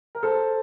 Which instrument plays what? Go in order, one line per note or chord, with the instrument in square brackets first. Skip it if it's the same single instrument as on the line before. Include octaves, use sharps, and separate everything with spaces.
[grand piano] A#4
A4 C5